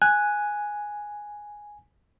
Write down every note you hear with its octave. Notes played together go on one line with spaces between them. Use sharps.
G#5 F#6